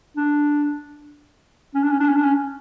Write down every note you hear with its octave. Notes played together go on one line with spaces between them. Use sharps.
D4
C#4
D4
C#4
D4
C#4
D4
C#4